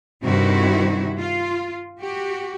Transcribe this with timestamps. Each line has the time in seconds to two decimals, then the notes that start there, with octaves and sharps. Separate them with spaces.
0.23 G2 C3 D#3 C4 E4 F#4
1.18 F4
1.99 F#4 G4